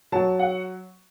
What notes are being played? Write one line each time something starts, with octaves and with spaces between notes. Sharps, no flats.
F#3 A5
F#5